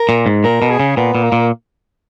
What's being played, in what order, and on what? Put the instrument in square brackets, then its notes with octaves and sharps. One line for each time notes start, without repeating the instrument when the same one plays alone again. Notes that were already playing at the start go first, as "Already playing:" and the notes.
Already playing: [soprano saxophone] A#4
[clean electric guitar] A#2
G#2
[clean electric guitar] A#2 [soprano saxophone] A#4
[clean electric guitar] B2
[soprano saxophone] G#4
[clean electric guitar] C#3
[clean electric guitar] A#2 [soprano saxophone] B3
[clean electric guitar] A#2
[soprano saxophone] A#3
[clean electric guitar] A#2